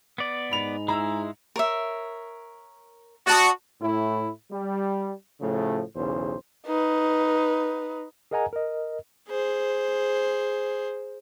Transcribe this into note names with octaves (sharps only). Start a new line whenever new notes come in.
B3 D5
G#2 B5 F7
G#3 E4 A#5 E6
A#4 C#5 E5
F#4 D5 A5 D#6
A2 E4
G3
A2 C#3 F3 A3
B1 E2 C#3 C5
D#4 B4
G#4 A#4 D#5 F#5 G#5 A#5
A#4 D#5
G#4 C5